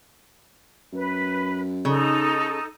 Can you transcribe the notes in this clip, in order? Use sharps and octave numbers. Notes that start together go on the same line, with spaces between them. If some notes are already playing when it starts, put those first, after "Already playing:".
F#2 B4
C#3 D#4 A4